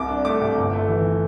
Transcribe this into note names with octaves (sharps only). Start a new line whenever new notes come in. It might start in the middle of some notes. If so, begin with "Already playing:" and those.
Already playing: C2 C3 D6
D4
A3 D6
C3
G1
A3
E3